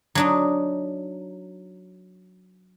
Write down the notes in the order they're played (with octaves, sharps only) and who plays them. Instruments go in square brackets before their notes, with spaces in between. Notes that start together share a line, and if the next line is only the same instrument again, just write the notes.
[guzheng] F#3 D4 D#4